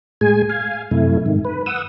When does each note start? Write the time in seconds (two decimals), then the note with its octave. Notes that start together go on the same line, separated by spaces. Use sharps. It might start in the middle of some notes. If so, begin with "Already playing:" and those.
0.21 A2 G#3 G#4 G#5
0.49 F5 G#5
0.91 F#2 C3 A3 E4
1.26 G#2 D#3
1.45 B4
1.66 F#5 D#6 E6